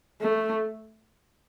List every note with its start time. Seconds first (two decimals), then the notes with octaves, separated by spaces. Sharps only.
0.21 A3